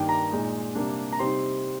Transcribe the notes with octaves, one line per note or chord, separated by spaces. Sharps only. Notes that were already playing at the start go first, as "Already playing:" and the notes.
Already playing: G2 D#3 A#3 D4 G5
A#5
A#2 G#3 D#4
C3 G3 A#3 D4
A#5
C3 G3 C4 D#4 C6